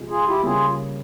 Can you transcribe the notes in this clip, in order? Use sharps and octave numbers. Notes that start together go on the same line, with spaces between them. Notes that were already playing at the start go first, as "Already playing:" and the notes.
Already playing: C3 F3 G#3
F4 G#4
E4 G4
C#3 G3 A#3 F4 G#4